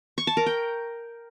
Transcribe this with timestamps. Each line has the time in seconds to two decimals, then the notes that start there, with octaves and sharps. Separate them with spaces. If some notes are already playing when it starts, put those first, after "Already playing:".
0.18 C#6
0.27 A5
0.37 A#4
0.46 G5